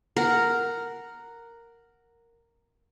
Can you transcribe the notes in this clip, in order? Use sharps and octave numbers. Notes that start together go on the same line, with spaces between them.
A#4 F#5